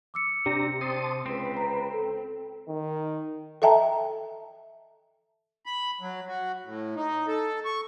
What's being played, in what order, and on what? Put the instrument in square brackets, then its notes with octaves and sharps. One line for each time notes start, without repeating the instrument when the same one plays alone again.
[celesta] D6 E6 C#7
[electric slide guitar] C3 [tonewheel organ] D4 G4 A#5
[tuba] C4 [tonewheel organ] A5 C6 D#6
[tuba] C#2 [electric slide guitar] C4 [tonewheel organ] B4
[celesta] A#5
A4
[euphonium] D#3
[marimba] A4 D#5 E5 G5 A5 A#5
[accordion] B5
F#3
F#4
A2
D#4
A4
C#6